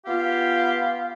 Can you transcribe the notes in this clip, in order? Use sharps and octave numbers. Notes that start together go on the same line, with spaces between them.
B3 F4 G4 F5